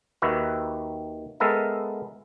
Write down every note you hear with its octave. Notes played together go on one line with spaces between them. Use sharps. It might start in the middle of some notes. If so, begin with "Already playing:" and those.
D#2 D#3 F#4 B4 E5
G#3 B3 A4 A#4 E5